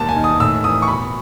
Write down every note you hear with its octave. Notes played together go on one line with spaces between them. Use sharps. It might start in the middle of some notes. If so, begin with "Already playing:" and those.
Already playing: E1 D#2 A5
G#5
D#3
D#6
A2 E6
E3 D#6
C#6
B2 B5